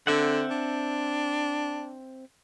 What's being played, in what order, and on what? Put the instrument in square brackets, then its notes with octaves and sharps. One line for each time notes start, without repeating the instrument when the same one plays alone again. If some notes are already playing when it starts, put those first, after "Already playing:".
[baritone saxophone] D3 [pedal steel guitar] C4 E5 F#5
[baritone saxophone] D4